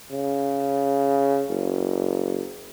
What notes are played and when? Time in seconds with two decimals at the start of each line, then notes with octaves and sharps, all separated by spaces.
0.11 C#3
1.50 F#1